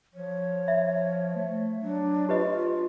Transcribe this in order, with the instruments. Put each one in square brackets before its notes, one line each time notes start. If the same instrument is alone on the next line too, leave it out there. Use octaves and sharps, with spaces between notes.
[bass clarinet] F3 [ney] C#5
[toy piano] E5
[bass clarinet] A3
[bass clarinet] F#3 [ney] D4
[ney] F4 [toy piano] G4 B4 D#5